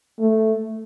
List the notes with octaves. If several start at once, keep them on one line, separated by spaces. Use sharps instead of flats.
A3